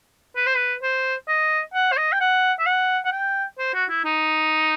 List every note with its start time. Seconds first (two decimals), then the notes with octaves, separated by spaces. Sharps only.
0.37 B4
0.47 C5
0.56 B4
0.83 C5
1.28 D#5
1.74 F#5
1.92 C5
1.97 D#5
2.12 G5
2.20 F#5
2.59 E5
2.66 F#5
3.05 F#5
3.12 G5
3.59 C5
3.74 F#4
3.90 E4
4.05 D#4